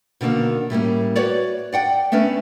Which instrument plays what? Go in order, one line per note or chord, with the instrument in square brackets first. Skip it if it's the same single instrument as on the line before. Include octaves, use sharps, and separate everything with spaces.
[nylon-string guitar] B2 D3 D#3 A#3 C#4
A2 G3 A#3 C#4
F#4 B4 C#5 D5
D5 F#5 G5
A3 B3 C#4 D4 B4